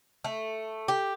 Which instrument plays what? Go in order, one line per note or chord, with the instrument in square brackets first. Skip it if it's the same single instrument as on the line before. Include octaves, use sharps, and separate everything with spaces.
[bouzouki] A3
G4